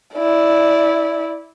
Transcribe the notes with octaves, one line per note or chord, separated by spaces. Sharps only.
E4 D5